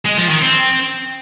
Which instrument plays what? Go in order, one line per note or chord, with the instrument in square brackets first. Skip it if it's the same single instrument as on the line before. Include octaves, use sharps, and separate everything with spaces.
[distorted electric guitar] G#3
F3
D#3
C4